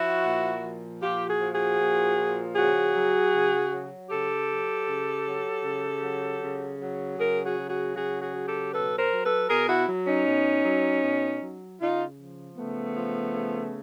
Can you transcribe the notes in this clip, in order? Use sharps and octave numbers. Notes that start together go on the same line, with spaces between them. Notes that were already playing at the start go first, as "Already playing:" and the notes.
Already playing: F3 E4 F#4
A#2
F3
A#2 F4 G4
F#4 G#4
F3
F#4 G#4
A#2
F3
C#3 F#4 G#4
F#3
C#3
F#3
C#3 G4 A4
F#3
C#3
F#3
C#3
F#3
C#3
F#3
C#3 G#4 A#4
F#4 G#4
F#3
F#4 G#4
C#3 F#4 G#4
F#4 G#4
F#3
G4 A4
B2 A4 B4
A#4 C5
F#3
A4 B4
B2 G#4 A#4
E4 F#4
F#3
C#4 D#4
B2
F#3
B2
F#3
C#3 D#4 F4
F3
C#3 A3 B3
F3
C#3